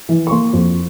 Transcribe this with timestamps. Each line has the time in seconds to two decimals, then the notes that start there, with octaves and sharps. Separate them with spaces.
0.09 E3
0.27 C#6
0.31 A#3 C6
0.53 F2